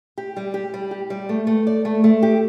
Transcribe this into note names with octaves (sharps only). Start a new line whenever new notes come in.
G4
G3
G4
G3
G4
G3
A3
A3
D5
A3
A3
G4